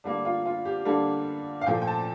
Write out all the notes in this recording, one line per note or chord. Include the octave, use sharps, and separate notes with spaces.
D3 G3 A#3 D4
F4
F4
G4
D3 G3 A#3 A4
F5
A#2 F3 A3 G5
G5
A5